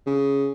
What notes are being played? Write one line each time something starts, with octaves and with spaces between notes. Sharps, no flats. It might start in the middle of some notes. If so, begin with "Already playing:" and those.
C#3